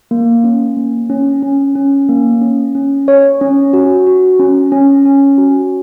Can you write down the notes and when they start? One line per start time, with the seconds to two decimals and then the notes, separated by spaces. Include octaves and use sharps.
0.11 A#3
0.44 C#4
0.77 A#3
1.10 C#4
1.43 C#4
1.76 C#4
2.09 A#3
2.42 C#4
2.75 C#4
3.08 C#5
3.41 C#4
3.73 F#4
4.07 F#4
4.39 C#4
4.72 C#4
5.05 C#4
5.38 F#4